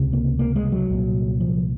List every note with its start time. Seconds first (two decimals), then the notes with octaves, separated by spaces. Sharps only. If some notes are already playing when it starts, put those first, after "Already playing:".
Already playing: C#2 C3
0.13 A#3
0.39 A#3
0.56 G#3
0.72 F#3
0.90 C2 A#2
1.40 F3